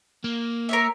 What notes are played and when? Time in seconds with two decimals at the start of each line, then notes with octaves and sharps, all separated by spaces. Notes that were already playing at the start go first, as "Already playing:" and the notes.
0.24 A#3
0.69 A#4 C#5 E5